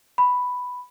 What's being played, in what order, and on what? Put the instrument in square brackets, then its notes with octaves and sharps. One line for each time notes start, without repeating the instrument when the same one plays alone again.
[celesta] B5